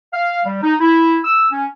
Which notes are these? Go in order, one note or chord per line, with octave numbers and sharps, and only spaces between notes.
F5
G3
D#4
E4
E6
C#4